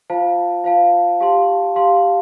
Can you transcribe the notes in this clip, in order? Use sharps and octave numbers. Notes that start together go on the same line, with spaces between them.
F4 C5 F5 A5
F4 C5 F5 A5
G4 F5 A5 C6
G4 F5 A5 C6